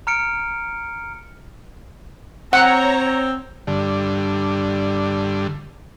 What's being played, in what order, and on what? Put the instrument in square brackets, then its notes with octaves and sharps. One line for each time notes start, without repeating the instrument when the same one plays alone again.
[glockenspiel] A#5 F6 C#7 D7
[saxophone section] C4 [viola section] C#5 A#5 [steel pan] F#5
[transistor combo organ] G2 D3